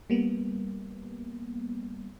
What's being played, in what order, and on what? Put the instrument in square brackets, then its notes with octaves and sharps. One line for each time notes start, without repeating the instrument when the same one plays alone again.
[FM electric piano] G3 A#3 B3